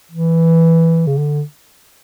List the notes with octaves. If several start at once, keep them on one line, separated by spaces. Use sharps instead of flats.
E3
C#3
D3